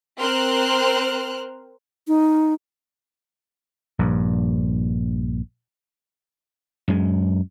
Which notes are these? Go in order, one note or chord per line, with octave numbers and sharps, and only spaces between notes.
C4 A#4 C5 C6 F6 F#6
D#4
A#1 G2
F#2 G#3